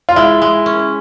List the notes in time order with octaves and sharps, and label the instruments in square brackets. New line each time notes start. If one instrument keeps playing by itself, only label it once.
[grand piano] F4
[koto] G#3 [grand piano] E4
[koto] G#3
C#4